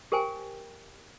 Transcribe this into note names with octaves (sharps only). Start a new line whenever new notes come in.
G4 A#4 C5 G5 G#5